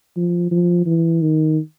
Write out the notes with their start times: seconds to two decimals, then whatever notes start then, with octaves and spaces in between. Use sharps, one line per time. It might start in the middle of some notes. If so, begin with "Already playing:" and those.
0.16 F3
0.51 F3
0.86 E3
1.21 D#3